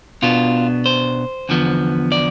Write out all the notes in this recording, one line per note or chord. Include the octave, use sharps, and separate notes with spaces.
B2 B3 D4 F4
C5
E2 D3 F3 B3
D5